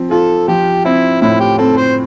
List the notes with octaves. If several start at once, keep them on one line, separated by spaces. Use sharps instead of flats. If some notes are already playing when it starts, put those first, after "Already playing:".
Already playing: F3 C4
F4 A4
F3 G4
C4 E4
A2 E4
G4
C4 A4
C5